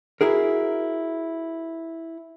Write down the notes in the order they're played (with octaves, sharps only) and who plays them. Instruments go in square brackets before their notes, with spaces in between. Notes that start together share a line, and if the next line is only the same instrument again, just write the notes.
[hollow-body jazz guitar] E4 F#4 G#4 A#4